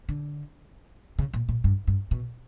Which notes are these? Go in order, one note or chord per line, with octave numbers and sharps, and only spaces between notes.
D3
C#3
A#2
A#2
G2
G2
B2